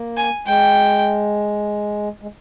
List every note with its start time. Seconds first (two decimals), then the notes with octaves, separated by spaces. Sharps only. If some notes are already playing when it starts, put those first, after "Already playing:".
Already playing: A#3
0.17 G#5
0.47 G#3 G5
2.22 G#3